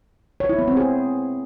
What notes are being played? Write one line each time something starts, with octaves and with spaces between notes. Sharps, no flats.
C#5
E4
B3
C4
G#4